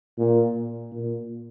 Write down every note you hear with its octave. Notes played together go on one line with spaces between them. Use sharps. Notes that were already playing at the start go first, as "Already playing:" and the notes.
A#2
A#2